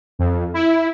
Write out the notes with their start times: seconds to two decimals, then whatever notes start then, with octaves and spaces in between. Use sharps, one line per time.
0.19 F2
0.54 E4